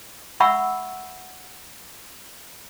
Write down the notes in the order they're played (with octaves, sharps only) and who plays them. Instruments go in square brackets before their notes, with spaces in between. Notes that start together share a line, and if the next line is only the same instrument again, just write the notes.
[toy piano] E5 F#5 B5 C#6 E6